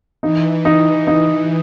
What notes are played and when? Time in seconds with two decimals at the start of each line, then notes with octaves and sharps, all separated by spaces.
0.23 E3 D#4
0.65 D#4
1.07 D#4